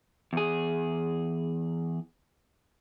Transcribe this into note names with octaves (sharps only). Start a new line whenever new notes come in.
E2 G#4